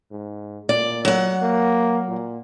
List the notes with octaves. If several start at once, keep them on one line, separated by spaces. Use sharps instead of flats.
G#2
A#2 D5
F#3 F#5
A#3
A#2